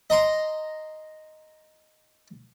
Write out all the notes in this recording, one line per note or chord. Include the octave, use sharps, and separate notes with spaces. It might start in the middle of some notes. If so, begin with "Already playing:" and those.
D#5 A#5 C6